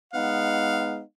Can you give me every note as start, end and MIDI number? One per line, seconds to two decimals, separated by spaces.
0.13 1.02 56
0.13 1.02 59
0.13 1.02 63
0.13 1.00 77
0.13 1.00 78